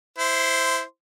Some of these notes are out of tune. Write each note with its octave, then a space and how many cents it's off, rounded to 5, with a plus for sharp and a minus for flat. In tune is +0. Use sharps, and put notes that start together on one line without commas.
E4 +0 C5 +0 C6 -25